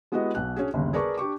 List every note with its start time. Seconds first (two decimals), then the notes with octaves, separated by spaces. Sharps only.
0.12 G#3 B3 E4 F#4 G4 D#5
0.35 B1 B2 F#6
0.56 C#4 D4 F#4 G#4
0.74 G1 D#2 C#3
0.93 G#4 A#4 B4 D5 A5 C#6
1.17 D4 G4 C#6 D6